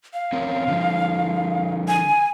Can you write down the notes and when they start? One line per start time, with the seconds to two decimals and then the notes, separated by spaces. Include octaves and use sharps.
0.13 F5
0.33 C4 C#4 A#4
0.68 D3 F3
1.88 G#5